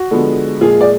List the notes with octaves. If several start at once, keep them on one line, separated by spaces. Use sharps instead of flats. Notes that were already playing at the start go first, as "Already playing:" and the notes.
Already playing: F#4
D3 F3 G#3 B3
A#2 F3 G#3 F4 G#4
D5